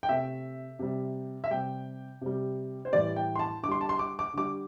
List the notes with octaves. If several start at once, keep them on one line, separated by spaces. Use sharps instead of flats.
G5
C3 A3 E5
C3 G3
E5
C3 G3 G5
C3 G3
C5
A2 E3 G3 D5
G5
C6
A5
D3 D6
G3 C6
A5
C6
D6
D6
D3 G3 D6